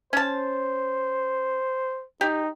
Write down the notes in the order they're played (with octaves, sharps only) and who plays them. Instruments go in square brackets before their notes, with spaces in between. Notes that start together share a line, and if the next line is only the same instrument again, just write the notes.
[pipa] C#4 A5 [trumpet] C5
[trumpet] D#4 [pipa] G4